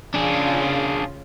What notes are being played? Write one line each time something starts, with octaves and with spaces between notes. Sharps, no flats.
C#3 D4 F4 G#4